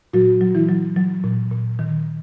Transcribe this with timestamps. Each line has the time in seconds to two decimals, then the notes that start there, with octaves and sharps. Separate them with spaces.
0.13 A#2 F#3 F#4
0.41 F#3
0.55 E3 E4
0.69 F#3
0.97 F#3
1.24 A#2
1.52 A#2
1.79 D#3